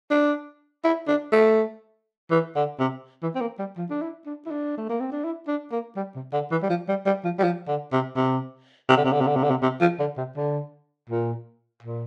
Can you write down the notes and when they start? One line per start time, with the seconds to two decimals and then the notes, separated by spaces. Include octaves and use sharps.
0.11 D4
0.84 E4
1.08 D4
1.32 A3
2.31 E3
2.55 D3
2.79 C3
3.22 E3
3.35 C4
3.41 A#3
3.59 G3
3.77 F3
3.90 D4
4.01 E4
4.26 D4
4.46 E4
4.51 D4
4.78 A3
4.89 A#3
5.00 C4
5.12 D4
5.24 E4
5.48 D4
5.72 A#3
5.96 G3
6.15 C3
6.33 D3
6.51 E3
6.62 G3
6.69 F3
6.88 G3
7.06 G3
7.24 F3
7.39 G3
7.44 F3
7.68 D3
7.92 C3
8.16 C3
8.89 C3
8.97 D3
9.04 C3
9.13 D3
9.21 C3
9.27 D3
9.36 C3
9.44 D3
9.50 C3
9.62 C3
9.81 F3
10.00 D3
10.17 C3
10.37 D3
11.10 A#2
11.83 A#2